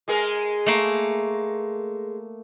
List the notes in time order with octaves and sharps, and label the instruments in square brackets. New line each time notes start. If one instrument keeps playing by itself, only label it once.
[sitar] G#3 G#4 A#4
[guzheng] A3 A#3